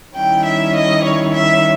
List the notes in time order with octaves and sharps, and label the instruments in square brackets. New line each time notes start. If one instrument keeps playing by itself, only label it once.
[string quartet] D#3 G3 C#4 E4 G5
E5
D#5
C#5
E5